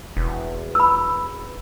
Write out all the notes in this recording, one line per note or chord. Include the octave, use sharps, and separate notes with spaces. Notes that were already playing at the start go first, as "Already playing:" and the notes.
E1
B5 E6